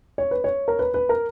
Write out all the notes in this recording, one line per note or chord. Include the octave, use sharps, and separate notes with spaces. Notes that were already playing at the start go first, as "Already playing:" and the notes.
C#5
B4
C#5
A#4
B4
B4
A#4